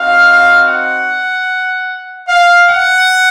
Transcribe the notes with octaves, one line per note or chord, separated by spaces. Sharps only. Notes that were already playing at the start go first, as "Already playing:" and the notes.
Already playing: C4 D#4 F#4 F5
F#5
F5
F#5